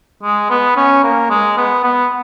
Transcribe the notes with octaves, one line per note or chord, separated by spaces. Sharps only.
G#3
B3
C#4
A#3
G#3
B3
B3